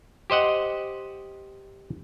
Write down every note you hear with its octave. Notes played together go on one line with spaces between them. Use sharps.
G4 C5 D#5 F#5